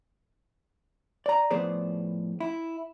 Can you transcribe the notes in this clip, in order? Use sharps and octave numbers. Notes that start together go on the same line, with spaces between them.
D5 A#5
A2 F3 B3 G#4 C5 D5
E4